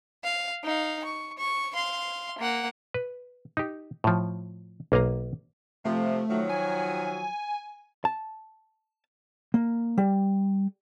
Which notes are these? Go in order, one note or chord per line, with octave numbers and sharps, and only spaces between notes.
F5
D#4 F5
C#6
C#6
F5 C6
A#3 F#5
B4
D#4 G4
A2 F3
B1 A#3 D#5 F5 A#5
C3 F3 A3
D#3 F3 F#3
G#5
A5
A#3
G3